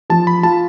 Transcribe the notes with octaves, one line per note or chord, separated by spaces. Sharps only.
F3 A5
B5
F4 A5